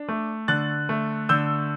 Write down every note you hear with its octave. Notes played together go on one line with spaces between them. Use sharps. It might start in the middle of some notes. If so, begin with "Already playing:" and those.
Already playing: D4
A3
D3 F#6 A6
A3
D3 E6 G6